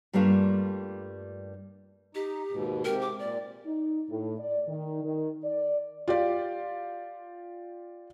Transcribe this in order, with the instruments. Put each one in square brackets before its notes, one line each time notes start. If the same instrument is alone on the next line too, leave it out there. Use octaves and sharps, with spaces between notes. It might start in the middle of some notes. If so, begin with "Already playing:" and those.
[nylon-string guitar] G2 G3 A3 A#3 D4 F4
[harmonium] D#4 [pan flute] G4
[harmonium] D#2 G#2 B2
[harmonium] G#2 C3 G4 [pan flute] A#4
[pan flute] D6
[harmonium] A#2 [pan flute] D5
[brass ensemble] D#4
A2
D5
D#3
D#3
D5
[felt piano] F4 G4 D5